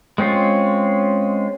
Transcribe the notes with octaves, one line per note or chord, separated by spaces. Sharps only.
G#3 C4 C#4 F4